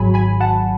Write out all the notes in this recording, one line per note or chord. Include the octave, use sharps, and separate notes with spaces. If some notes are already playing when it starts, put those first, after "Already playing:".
Already playing: G#1 G#2 F#3 G#5 B5
G#5 B5
F#5 A5